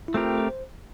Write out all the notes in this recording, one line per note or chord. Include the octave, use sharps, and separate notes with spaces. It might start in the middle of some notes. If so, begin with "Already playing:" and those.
E4
A3 C4 F4 G4 A#4
C5